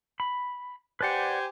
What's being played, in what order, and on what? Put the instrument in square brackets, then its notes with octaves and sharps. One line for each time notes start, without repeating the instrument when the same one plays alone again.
[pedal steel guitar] B5
[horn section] G4 C5 G#5 [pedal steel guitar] B4 D5 F#5